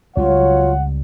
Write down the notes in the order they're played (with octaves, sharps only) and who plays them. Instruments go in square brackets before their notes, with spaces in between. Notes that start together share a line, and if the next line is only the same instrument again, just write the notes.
[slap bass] C#2 C#3 G3 [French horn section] F#3 C#5 [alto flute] F4 [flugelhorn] F#5